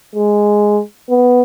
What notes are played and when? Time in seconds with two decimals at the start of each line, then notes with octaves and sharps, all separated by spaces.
0.15 G#3
1.10 B3